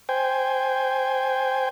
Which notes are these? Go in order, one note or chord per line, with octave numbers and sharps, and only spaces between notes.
C5 G5 G#5